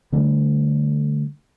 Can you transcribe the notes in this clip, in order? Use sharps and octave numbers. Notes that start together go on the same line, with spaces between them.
D3 G3 A3 D4